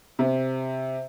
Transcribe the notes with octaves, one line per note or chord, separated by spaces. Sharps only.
C3